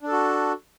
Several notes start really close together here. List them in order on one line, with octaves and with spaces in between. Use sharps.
D4 A4 F#4